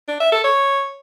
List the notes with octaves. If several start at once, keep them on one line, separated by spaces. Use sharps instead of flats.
D4
E5
A4
C#5